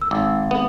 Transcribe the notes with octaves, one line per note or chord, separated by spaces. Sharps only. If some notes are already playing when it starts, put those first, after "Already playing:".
E6
G#1 D6
B3